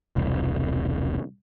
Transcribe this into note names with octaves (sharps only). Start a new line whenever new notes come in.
E1 C2